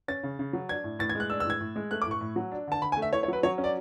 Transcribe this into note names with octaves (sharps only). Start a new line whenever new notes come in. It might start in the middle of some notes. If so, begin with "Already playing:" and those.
C#4 A6
C#3
C#3
F#3
D4 G#6
A2
A2 A6
G#6
G#3
F#6
D4 E6
E6
A2 G#6
A2
G#3
A3 F#6
D6
A2
C#6
A2
F#3
D4
D3 A5
D3 B5
G#5
A3
E5
E4 C#5
C#5
F#3 B4
F#3 C#5
C#4
D5